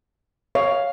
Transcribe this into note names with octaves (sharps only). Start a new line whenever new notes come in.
C#5 F5